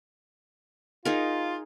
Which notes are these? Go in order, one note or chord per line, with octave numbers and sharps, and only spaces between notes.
D#4 F4 G#4 A#4